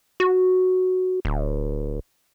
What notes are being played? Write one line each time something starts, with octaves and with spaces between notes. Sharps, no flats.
F#4
D1